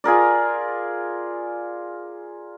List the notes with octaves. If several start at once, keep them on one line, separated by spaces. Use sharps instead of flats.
F4 G#4 A#4 D5